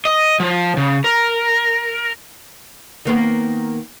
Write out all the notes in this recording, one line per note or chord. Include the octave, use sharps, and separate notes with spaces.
D#5
F3
C#3
A#4
D#3 A#3 B3